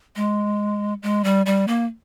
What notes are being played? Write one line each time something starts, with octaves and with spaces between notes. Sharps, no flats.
G#3
G#3
G3
G3
A#3